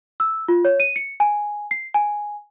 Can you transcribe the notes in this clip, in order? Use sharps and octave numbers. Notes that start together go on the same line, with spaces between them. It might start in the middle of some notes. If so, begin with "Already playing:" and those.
E6
F4
C#5
D#7
C#7
G#5
C7
G#5